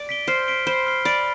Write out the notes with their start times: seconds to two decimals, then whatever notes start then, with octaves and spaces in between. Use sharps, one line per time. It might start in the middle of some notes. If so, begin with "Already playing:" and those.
Already playing: D5
0.09 B6 D7 G7
0.28 C5 F6
0.48 B6 D7 G7
0.67 C5 B5
0.87 F6 C7 G7
1.05 D5 B5